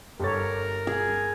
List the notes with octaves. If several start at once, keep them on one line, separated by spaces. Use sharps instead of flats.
G1 G4 A4 A#4 C#5 A6
G#4